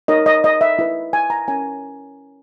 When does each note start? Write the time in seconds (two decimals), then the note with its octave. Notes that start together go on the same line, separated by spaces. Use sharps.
0.08 D#4 A#4 C#5 D#5
0.26 D#5
0.44 D#5
0.61 E5
0.79 E4 B4
1.13 G#5
1.30 A#5
1.48 C#4 E4 A#4 C#5 G#5